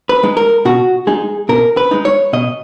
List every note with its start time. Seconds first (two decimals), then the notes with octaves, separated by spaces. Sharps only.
0.09 B4
0.23 G#3 D#4
0.37 A#4
0.65 B2 F#4
1.07 G#3 D#4 G#4
1.49 B2 A#4
1.77 B4
1.91 G#3 D#4
2.05 C#5
2.33 B2 D#5